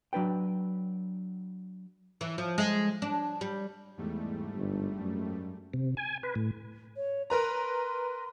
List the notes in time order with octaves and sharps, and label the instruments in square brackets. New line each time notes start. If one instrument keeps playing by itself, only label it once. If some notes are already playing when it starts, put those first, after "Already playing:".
[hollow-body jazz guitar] F#3 D4 B4 G5
[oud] E3
F3
G#3
D4
G3
[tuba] E2 [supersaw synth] G#2 G3 A3
[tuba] G1
F#2
[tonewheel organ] C3
G#5
B4
A2
[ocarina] C#5
[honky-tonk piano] A#4 B4 A#5 [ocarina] C6